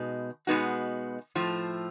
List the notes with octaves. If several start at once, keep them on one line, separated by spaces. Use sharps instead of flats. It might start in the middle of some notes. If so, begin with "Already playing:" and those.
Already playing: B2 G#3 B3 D#4 F#4
B2 G#3 B3 D#4 F#4
A2 F3 A3